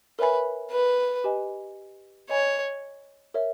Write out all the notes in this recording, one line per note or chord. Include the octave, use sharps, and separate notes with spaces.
A#4 B4 C#5 E5 G#5 B5
B4
G4 B4 D#5 G#5
C#5 D#5 G#5 B5
A#4 C#5 E5